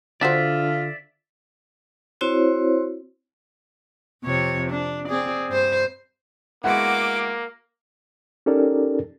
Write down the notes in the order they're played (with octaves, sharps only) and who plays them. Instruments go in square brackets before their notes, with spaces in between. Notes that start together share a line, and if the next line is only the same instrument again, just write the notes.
[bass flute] D3 [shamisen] D4 F#4 C5 [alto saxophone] F4 [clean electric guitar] D5 E5
[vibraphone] C4 E4 F#4 C5 C#5
[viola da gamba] F2 C3 C#5
D4
C4 G#4 D5
G2 C5
[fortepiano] G#3 B3 E4 [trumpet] A#3 [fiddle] F#4 D6 [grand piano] F#5
[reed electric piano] C#4 D#4 G4 A4 A#4 D5